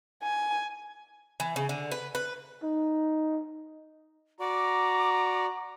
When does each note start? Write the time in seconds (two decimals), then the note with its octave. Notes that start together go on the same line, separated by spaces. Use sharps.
0.23 G#5
1.40 E3
1.56 C#3
1.69 D3
1.91 B4
2.15 B4
2.63 D#4
4.40 F#4 D5 A#5 D6